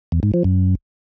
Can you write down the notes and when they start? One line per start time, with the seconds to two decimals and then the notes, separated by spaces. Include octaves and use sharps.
0.12 E2
0.23 G#2
0.34 F3
0.44 F#2